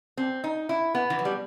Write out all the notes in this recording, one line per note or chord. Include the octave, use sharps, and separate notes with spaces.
C4
D#4
E4
B3
E3
F#3
G3